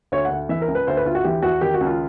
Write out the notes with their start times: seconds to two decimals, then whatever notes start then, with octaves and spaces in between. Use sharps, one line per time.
0.12 D2 C#5
0.25 F#5
0.31 D2
0.49 E3 E5
0.62 A#4
0.68 C#2
0.75 B4
0.87 D2 C5
0.97 B4
1.06 D2 F4
1.15 F#4
1.24 E3 G4
1.42 E2 F#4
1.61 D#3 G4
1.74 F#4
1.81 C#2
1.87 F4